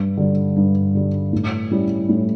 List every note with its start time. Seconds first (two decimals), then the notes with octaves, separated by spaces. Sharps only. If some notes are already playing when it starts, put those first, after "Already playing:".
Already playing: G2
0.17 D3 G3
0.56 G2
0.95 D3 G3
1.33 A2
1.71 G3 C#4 E4
2.09 A2